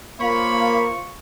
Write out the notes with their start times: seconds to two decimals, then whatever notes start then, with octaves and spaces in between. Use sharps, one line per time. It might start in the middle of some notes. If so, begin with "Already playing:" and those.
0.20 A#3 F4 C5 C#5 B5 C#6